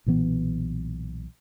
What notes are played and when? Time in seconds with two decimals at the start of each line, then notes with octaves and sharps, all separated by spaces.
0.06 B1 A#2 E3 B3